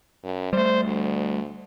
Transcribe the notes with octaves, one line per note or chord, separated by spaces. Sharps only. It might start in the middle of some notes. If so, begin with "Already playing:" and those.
F#2
G3 A3 C5
D2